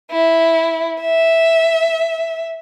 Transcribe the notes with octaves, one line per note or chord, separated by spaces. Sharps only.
E4
E5